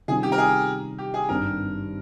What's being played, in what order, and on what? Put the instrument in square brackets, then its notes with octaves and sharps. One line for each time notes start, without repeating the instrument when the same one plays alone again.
[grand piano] C3 D#3 G3 C#4 F4 [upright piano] G#4
[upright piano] G4
A#4
G#4
G4
G#4
[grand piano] G#1 G2 D#3 G3 C4 [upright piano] A#4